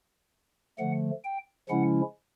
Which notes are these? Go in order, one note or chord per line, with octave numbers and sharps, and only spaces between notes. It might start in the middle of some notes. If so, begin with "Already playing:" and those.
D3 F3 A3 F#5
G5
C#3 F3 G#3 C#4 E4 F#5